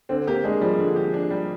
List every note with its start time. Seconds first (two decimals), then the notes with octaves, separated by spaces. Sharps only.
0.09 D3 C4
0.27 A#3 G4
0.44 G#3 D4
0.61 F3 G3
0.78 D3
0.96 G4
1.14 D4
1.30 G3